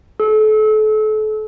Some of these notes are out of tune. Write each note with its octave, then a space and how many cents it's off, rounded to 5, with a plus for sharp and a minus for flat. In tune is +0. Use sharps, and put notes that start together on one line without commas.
A4 -35